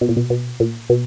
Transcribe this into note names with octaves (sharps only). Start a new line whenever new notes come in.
B2
A#2
B2
B2
A#2
B2